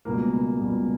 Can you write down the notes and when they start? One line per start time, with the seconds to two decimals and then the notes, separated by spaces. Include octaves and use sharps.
0.05 C#2 B2 G3 A#3
0.60 C#2 B2 G3